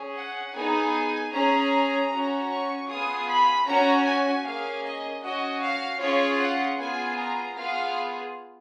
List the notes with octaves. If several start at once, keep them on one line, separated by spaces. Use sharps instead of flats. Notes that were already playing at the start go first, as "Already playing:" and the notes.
Already playing: C#4 G#4
F#5
B3 D#4 G#4 G#5
C#4 G#4 A#5
C#4 F#4
C#6
B3 F4 G#4 D#6
B5
C#4 F#4 A#5
G#5
A#3 C#4 G#4 F5
D#5
C#4 F#4 D#5
F5
C#4 F4 G#4 C#5
F#5
B3 F4 G#4 G#5
A#5
B3 F4 G#4 F5